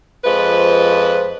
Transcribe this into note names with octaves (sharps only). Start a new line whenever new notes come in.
F2 F3 G#3 B4